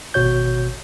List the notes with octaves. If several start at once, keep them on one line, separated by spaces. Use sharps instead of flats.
G#1 B2 F#4 C#5 G6